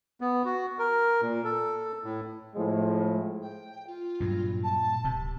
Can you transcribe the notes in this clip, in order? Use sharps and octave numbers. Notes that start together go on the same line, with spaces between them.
B3
F#4
A#4
A#2
A4
A2
A2 F3 G#3
G5
F4
G2 A#2 F#3
A5
D1 C3